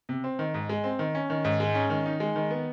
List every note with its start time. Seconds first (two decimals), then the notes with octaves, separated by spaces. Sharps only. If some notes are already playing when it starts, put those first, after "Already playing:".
0.09 C3
0.24 C4
0.39 D#3
0.54 G#2
0.69 G#3
0.84 C4
0.99 D#3
1.15 C#4
1.30 D#3
1.45 G#2
1.60 G#3
1.75 C#4
1.90 D#3
2.06 D#4
2.20 G#3
2.36 D#3
2.51 B3